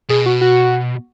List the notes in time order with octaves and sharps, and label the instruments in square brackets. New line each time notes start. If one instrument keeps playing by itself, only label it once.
[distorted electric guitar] B2 [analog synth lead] G#4
[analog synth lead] F#4
F#4